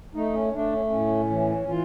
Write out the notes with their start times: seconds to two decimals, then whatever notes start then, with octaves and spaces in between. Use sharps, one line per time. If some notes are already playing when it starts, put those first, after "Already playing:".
0.15 A3 D#4
0.34 C#4
0.53 A3 D4
0.73 C#4
0.90 A2 C#4
1.30 E3
1.68 E3 F4